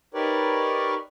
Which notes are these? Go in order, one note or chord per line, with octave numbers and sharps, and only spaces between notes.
D#4 G4 A#4 B4 C#5 D5